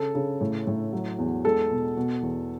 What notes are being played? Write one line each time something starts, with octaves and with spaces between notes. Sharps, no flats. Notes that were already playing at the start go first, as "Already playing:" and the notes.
Already playing: C#3 A4
C#3
A2
A2
F#3
E2
G#3 A4
B2
B2
E2